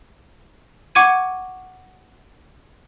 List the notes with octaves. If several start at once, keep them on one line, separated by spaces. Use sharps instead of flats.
F#5 C#6 D6 G#6 D#7